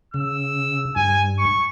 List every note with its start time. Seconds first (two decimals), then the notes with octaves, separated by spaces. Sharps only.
0.14 C#3 E6
0.96 G2 G#5
1.39 C#6